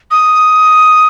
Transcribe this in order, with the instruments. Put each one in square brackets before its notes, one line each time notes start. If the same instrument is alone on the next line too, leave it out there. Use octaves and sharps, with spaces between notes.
[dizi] D#6